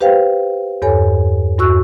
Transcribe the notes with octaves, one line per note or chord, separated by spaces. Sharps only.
G4 B4 C5 F5 G5
E2 G2 A4 C#5 G#5
E2 G2 F#4 C#6 E6 F#6